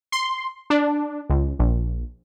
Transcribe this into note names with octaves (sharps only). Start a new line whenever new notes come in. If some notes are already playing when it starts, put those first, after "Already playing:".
C6
D4
C#2
A#1